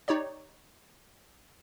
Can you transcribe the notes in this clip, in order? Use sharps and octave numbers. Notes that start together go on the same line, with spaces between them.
D#4 G4 C#5 D5